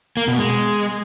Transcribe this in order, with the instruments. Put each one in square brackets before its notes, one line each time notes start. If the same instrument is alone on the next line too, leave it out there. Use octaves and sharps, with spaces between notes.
[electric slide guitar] A#3
B2
G#3